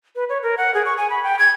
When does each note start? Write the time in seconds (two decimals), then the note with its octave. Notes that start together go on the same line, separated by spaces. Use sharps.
0.16 B4
0.29 C#5
0.43 A#4
0.58 F#5
0.74 G#4
0.86 C#6
0.97 G#5
1.10 B5
1.24 G5
1.39 G#6